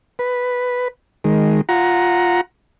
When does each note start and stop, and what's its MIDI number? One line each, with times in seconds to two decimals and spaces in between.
0.19 0.88 71
1.24 1.61 51
1.24 1.61 56
1.69 2.41 65
1.69 2.41 78
1.69 2.41 82